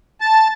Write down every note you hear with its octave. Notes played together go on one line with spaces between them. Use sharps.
A5